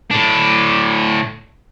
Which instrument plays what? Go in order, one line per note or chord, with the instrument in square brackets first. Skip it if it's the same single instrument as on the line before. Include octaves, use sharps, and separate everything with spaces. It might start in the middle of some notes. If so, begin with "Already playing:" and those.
[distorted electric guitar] A2 D4